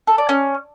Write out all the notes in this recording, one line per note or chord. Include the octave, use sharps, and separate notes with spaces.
A4
D5
C#4